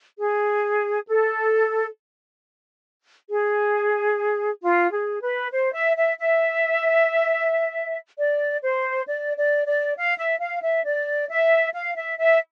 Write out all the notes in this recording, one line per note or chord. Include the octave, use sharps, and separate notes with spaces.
G#4
A4
G#4
F4
G#4
B4
C5
E5
E5
E5
D5
C5
D5
D5
D5
F5
E5
F5
E5
D5
E5
F5
E5
E5